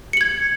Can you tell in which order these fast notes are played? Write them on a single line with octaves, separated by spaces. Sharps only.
C#7 F#7 G#6